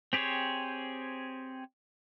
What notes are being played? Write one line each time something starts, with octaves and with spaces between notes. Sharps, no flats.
C4 G4 G#4 C5 C#5